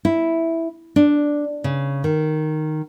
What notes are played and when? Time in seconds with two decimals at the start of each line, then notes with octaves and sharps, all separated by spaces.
0.05 E4
0.96 D4
1.64 C#3
2.04 D#3